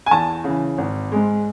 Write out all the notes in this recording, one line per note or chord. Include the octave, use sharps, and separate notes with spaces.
G#5
E2 A5
C#3 E3
G#1
G#2 G#3